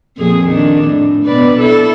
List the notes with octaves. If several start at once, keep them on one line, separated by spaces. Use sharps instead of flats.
F2 A#2 G#4
D#3 D4
A2
B2 B4 D5
E4 A4